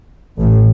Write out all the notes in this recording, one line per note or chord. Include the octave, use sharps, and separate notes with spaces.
A1 A2